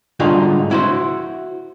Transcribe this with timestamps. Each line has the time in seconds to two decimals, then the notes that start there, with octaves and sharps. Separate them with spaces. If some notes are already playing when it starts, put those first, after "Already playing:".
0.20 G#2 D3 G3 D#4 F4 F#4
0.71 E4 F#4 C5